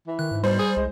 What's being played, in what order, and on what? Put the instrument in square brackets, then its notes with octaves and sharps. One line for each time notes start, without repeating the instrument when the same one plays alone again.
[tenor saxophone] E3
[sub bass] D#3 [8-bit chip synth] F#6
[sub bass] G#2
[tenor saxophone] B2 [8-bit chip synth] G3 [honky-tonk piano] C5
[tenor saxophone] G#4
[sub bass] C2 [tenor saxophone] G#3